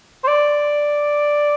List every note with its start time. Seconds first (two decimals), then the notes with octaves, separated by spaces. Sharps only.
0.24 C5
0.28 D5